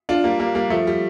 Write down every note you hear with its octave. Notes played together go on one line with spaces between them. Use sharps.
D4 F4
G3 A#3
G3 A#3
G3 A#3
F3 A3
G3